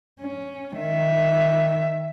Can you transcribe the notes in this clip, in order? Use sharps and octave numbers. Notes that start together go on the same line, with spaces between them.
C#4
D#3 E5